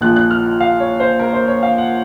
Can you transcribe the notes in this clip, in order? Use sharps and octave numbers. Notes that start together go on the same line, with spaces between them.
A#1 A#2 F3 F#6
F#6
F6
F5
C#5
C5
A#4
C5
C#5
F5
F#5